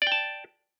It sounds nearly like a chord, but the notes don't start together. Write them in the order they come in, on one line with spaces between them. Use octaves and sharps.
D5 G5 A5